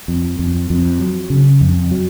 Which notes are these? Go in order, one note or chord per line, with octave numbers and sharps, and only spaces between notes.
F2
F2
F2
F#3
C#3
F2
F#3